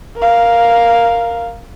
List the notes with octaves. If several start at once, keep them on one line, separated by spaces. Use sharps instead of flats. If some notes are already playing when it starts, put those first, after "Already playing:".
A#4 F5